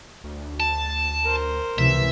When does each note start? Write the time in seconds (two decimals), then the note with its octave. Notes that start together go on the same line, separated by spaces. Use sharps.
0.24 D2
0.60 A5
1.23 A#4 C5
1.78 C#2 C3 E3 E5